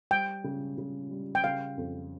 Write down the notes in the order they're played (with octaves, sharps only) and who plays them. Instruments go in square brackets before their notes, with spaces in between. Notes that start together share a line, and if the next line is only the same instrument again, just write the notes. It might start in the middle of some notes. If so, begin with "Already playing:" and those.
[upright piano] G3 [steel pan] G5
[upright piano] C#3
C#3
G3
[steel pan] G5
[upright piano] C#3 [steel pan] F5
[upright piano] F2